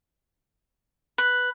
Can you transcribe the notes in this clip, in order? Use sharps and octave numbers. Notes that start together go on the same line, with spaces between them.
B4